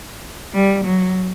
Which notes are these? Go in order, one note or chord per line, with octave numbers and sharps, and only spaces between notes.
G3
F#3